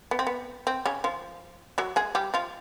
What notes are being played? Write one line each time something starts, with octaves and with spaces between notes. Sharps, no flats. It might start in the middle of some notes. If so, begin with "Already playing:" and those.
B3
C4
B3
C4
C#3 C#4
F3 F4
F#3 F#4
G#3 G#4
G3 G4
F3 F4